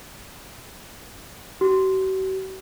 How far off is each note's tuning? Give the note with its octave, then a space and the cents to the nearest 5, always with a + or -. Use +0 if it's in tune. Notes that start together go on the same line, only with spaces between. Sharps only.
F#4 +45